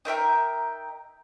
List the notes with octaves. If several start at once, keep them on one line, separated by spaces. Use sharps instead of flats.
D#4 A#4 E5 G5